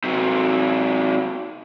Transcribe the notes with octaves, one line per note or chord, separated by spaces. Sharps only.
C3 F#3